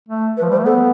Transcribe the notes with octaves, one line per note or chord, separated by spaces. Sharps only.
A3
B4
F3
G3 C5
A3
B3 A4